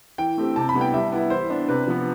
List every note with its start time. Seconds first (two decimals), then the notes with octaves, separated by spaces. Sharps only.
0.18 E3 G5
0.38 A3 C4 G4
0.56 C3 A5
0.69 B5
0.74 G3 B3 E4
0.81 G5
0.94 G3 E5
1.12 B3 E4
1.30 E3 C5
1.50 B3 D4
1.69 C3 B4
1.87 F3 B3